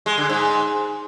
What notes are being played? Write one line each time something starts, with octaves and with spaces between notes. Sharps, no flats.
G#3
D3
G#2